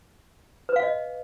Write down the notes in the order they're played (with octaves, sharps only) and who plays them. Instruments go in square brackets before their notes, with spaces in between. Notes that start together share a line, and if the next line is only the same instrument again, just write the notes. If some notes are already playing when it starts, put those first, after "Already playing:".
[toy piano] B4
F5
D#5